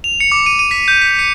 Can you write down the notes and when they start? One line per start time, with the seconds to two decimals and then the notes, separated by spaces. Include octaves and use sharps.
0.04 F7
0.20 C#7
0.32 D6
0.46 D#7
0.59 D#7
0.71 B6
0.88 G6
1.02 B6
1.19 C#7